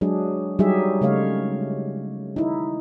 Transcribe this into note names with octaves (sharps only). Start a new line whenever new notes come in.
F#3 G#3 D4 G#4
F#3 G3 D#4 G4 G#4 E5
C#3 G#3 A3 C#5 F5
D#4 E4